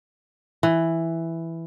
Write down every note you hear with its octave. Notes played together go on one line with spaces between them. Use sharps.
E3